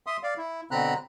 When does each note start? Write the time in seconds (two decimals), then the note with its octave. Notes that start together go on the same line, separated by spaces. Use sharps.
0.07 E5 C6 D#6
0.23 D5 F5
0.38 E4
0.71 B2 D3 C4 A#5 B5 F#6